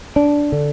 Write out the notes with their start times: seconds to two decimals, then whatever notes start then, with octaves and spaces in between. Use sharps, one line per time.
0.16 D4
0.52 D3